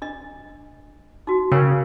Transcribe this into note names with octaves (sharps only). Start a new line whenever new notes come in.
D4 D#5
D#4 F#4
C#3 A#4 C#5 G5